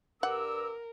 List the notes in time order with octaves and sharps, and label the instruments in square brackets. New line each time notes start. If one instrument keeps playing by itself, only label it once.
[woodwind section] G2 D6 E6 [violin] A#4 [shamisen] F#5